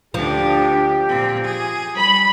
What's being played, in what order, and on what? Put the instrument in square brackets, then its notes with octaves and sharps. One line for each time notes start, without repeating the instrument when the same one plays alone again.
[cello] D2 D4 [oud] F3 [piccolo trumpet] G4
[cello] A#2 C4
G#4
[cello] G3 [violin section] B5